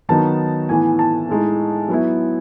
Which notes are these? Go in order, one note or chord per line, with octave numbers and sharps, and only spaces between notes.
D#3 F#3 B3 D#4 A5
A2 E3 B3 G#5
A5
A2 G#3 D#4
F#3 B3 E4